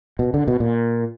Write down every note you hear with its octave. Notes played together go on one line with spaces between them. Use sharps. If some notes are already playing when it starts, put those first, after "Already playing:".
B2
D3
B2
A#2